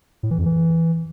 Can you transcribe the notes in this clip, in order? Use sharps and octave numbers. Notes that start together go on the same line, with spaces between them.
A2
E3
F2
E3